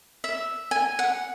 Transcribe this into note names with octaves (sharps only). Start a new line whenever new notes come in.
E5
G#5
F#5